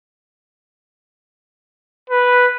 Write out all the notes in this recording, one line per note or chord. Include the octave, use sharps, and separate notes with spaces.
B4